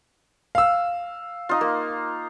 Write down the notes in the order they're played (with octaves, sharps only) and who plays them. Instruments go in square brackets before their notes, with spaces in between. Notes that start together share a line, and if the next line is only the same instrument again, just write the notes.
[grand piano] F5 E6
[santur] D#4 F4
A#3